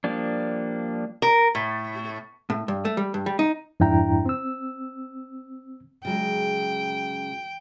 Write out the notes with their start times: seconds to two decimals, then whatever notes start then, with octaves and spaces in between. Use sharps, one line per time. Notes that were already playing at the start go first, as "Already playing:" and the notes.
0.04 F3 G3 A#3 D4
1.22 A#4
1.55 A2
2.50 A2
2.68 G2
2.85 A3
2.97 G3
3.14 G2
3.26 G3
3.39 D#4
3.80 F2 G#2 D4 E4 G5 A#5
4.26 C4 E6
6.05 C#3 F#3 G#3 G5